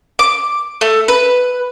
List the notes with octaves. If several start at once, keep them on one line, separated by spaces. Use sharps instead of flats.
D6
A3
B4